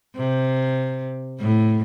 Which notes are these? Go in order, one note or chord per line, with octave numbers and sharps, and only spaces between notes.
C3
A2